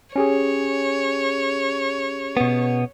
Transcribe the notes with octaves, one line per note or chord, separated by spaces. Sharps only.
C#4 G4 G#4 C#5
B2 B3